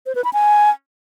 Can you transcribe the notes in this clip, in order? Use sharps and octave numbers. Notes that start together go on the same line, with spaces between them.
C5
B4
B5
G#5